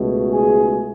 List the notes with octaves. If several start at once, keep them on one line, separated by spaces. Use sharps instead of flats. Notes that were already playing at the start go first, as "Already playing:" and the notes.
Already playing: C#2 B2 A3
G#4